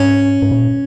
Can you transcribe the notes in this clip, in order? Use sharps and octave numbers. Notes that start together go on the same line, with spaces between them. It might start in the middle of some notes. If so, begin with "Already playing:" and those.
Already playing: G#2 C#4
G#2
A#2